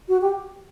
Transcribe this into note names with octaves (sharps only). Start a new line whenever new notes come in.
F#4
G4